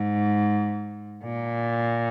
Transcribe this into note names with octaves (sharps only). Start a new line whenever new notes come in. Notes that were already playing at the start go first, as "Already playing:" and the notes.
Already playing: G#2
A#2